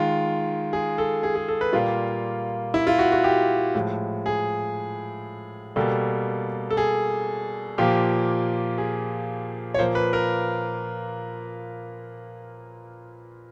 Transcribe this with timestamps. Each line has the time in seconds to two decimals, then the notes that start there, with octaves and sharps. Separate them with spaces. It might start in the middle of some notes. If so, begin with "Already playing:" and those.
Already playing: D#3 G#3 F4
0.73 G#4
0.98 A4
1.23 G#4
1.35 G#4
1.48 A4
1.61 B4
1.73 A#2 G3 A#3 F4
2.74 E4
2.87 F4
2.99 F#4
3.12 F#4
3.24 G4
3.75 A2 F3 G#3
4.26 G#4
5.76 B2 G3 A#3 A4
6.70 A4
6.77 G#4
7.78 A#2 F3 A#3 G4
8.78 G#4
9.74 C#5
9.79 A#2 F3 A#3 C5
9.95 B4
10.13 A#4